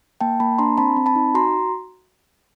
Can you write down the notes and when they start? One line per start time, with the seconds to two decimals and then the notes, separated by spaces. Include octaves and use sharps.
0.21 A#3 G5 A5
0.40 A#3 A5 B5
0.58 D4 A#5 C6
0.78 C4 A5 B5
0.97 C4
1.06 A5 B5
1.16 D#4
1.34 F#4 A#5 C6